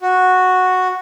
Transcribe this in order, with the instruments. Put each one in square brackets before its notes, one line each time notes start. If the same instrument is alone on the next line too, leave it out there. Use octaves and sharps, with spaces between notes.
[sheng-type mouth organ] F#4